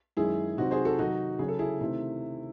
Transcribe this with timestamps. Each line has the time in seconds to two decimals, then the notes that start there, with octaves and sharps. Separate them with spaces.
0.17 F#2 D#3 G#3 C#4 E4 G#4
0.57 C3 D#3 F#3 C4 D#4 F#4
0.71 G#4 C5
0.85 F#4 A4
0.98 C3 D#3 F#3 D#4 F#4
1.39 C#3 F#3 C#4 G#4
1.48 A4
1.59 E4 G#4
1.81 C3 D#3 A3 C4 E4